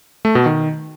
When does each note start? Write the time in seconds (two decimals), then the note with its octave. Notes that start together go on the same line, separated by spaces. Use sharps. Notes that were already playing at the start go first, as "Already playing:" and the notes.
0.25 A3
0.35 B2
0.46 D#3